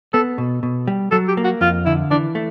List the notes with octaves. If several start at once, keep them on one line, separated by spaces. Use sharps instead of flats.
B3 A4
B2
B2
G3
F#3 A4
G4
A#3
F#4
F2 F4
D3 E4
E3 D4
A3